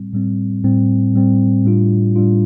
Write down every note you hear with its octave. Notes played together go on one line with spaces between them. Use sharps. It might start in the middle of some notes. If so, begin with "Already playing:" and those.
Already playing: A2 G3 C4
A2 G3 C4
A2 G3 C4
A2 G3 C4
A2 G3 D4 F4
A2 G3 D4 F4